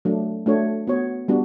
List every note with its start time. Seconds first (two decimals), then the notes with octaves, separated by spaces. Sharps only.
0.05 F#3 A3 D4
0.46 A3 D4 F#4 C#5
0.87 B3 F#4 C#5
1.28 G3 B3 D4 F#4